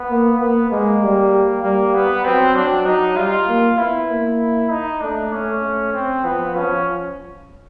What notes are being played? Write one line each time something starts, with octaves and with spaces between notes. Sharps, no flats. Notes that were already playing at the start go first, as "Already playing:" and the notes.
Already playing: B3
A#3
A#3 B3
G#3 A#3
G3
G3 A#3
B3
F#3 C4
F#3 D4
F#3 D#4
G3 F4
A#3
B3 E4
A#3
D#4
A3 D4
A3 C#4
A3
C4
F3 B3
F3 C#4